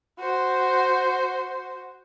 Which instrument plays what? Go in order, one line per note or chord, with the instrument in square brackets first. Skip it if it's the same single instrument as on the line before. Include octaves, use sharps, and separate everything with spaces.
[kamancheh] F#4 C5